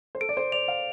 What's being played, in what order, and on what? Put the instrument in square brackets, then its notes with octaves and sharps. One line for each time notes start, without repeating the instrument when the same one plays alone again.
[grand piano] C5
[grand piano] A4 [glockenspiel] D7
[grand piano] D5
C5
[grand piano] D5 [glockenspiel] F7
[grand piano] F5